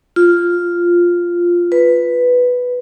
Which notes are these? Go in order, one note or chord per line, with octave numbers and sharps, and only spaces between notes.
F4
B4